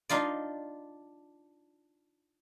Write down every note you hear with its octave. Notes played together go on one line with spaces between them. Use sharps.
D4 D#4 F4 D5